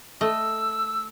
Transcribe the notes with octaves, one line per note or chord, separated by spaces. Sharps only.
A3 D#5 E6